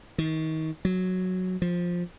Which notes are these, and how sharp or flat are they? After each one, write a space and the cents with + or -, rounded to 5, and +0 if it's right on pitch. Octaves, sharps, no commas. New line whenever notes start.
D#3 +30
F#3 -5
F3 +10